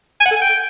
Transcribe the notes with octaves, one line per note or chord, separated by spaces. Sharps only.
G#5
F#5
A4
G#5
G5